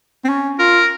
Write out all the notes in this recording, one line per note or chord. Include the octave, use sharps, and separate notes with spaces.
C4
C#4
F4 A#4